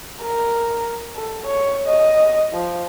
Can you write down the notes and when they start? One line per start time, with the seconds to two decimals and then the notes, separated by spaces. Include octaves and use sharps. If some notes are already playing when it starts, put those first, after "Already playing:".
0.22 A#4
1.16 A4
1.47 C#5
1.87 D#5
2.54 F3